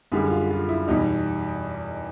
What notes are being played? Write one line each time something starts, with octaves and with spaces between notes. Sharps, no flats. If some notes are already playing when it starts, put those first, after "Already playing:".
F#2 D3 G3 G#4
F4
F4
E4
E2 B2 G3 D#4